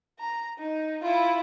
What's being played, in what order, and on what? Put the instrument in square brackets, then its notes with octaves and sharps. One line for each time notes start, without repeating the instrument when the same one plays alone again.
[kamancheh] A#5
D#4
E4 F4